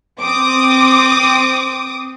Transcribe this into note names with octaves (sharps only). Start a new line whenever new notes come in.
C4 D6 D#6